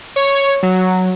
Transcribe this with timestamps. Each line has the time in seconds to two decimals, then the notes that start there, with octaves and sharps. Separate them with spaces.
0.16 C#5
0.63 F#3